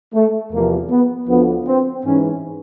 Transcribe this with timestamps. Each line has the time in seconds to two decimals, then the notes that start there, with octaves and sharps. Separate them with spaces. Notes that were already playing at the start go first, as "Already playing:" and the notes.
0.14 A3
0.51 E2 C3 F3 A#3
0.90 B3
1.28 D2 D3 F3 B3
1.67 C4
2.04 G#2 E3 C#4